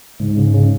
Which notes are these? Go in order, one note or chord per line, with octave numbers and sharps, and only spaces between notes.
C#2 G#2
C#3
C#3